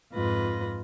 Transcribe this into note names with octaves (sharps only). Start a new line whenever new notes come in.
F2 G#2 F4 B4 A#6